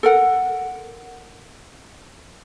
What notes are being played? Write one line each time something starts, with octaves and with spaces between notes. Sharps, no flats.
A4 A#4 F#5